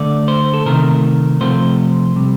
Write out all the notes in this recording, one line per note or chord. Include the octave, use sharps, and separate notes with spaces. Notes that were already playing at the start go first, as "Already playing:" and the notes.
Already playing: D3 A3 D5
C5
A4
C3 D#3 A3 A#4
C3 F3 A3 C5
C3 G3